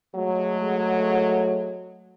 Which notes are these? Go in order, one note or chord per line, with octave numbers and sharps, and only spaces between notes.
F#3 G#3 A3